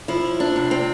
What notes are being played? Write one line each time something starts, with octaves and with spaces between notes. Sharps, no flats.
F3 E4
D4
C3
C4